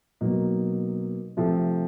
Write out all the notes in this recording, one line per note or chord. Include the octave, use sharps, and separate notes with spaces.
B2 F#3 A#3 D#4
C3 F3 A3 C4